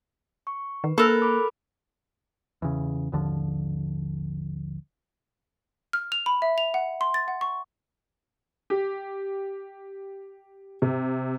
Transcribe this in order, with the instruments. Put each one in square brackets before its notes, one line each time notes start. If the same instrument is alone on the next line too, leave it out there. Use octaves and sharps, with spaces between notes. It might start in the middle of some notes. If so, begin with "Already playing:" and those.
[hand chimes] C#6
[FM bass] D#3 [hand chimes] B4
[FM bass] A#3 [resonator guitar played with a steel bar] A4 A#4 [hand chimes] B5 F#6
[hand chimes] B5 D6
[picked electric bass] E2 C#3
G#1 D#2 D3 F3
[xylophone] F6
F7
B5
E5
F7
F#5
C6
A6
F#5
C#6
[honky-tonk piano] G4
C3